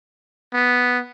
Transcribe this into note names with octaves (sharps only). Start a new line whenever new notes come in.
B3